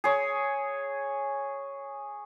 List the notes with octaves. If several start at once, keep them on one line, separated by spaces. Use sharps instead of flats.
G#4 C#5